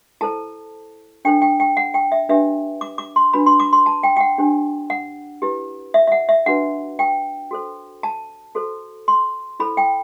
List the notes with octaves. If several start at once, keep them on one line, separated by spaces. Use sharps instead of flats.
E4 A4 C5 A5
D4 A4 C5 G5
G5
G5
F#5
G5
E5
D4 G4 B4 E5
D6
D6
C6
D4 F#4 B4 B5
C6
D6
C6
A5
G5
G5
F#5
D4 G4 C5
F#5
E4 G4 B4
E5
E5
F#5
E5
D4 F#4 B4 F#5
G5
F#4 A4 C5
A5
F#4 A4 C5
C6
E4 A4 C5 B5
G5